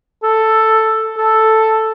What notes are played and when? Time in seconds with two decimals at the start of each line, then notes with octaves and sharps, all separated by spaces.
0.23 A4
1.18 A4